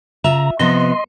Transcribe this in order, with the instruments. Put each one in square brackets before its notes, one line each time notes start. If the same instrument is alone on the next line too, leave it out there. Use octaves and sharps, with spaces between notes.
[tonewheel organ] C#3 A#5 [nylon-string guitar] F4 E5
[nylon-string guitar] C3 F3 B3 [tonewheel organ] D#5 C6